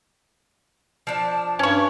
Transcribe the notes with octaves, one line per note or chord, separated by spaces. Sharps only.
F3 D4 A5
G2 C#4 C#5